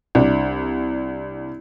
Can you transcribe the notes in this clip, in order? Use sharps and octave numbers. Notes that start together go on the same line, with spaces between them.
C2 D4